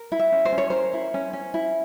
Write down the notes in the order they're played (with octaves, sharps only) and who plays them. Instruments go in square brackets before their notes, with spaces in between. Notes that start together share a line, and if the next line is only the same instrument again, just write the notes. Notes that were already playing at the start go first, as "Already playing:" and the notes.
Already playing: [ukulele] A#4
E4
E5
C#4
C5
C#4
C#5
A#4 C5
E4
C#4
C#4
E4